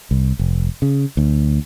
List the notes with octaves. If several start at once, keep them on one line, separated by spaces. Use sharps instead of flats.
C2
F1
C#3
D2